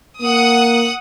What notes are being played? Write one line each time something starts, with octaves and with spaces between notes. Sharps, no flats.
A#3 F#5 D#6